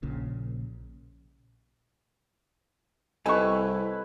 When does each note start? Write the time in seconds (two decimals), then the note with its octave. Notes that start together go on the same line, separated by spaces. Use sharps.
0.03 A#1 A#2 C#3
3.26 C2 D#4 E4 G4 A4 B4 G#5 C#6